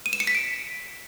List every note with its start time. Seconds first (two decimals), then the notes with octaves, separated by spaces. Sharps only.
0.06 D#7
0.13 E7
0.20 C#7
0.27 B6
0.35 D7